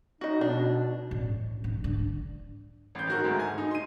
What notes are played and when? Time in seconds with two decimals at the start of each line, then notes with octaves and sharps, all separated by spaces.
0.21 D#4 F#4 D#5
0.41 B2 D4
1.11 A1
1.64 G#2
1.84 D3
2.95 A1 G6
3.08 D#3 F#4 A#4
3.24 D2 G#2
3.39 G#5
3.58 D#4
3.71 C6 D#7